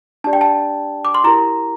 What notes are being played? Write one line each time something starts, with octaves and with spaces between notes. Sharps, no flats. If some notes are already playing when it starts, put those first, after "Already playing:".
D4 G4 D5 A5
G5
A5
D6
C6
E4 G4 A#4 A#5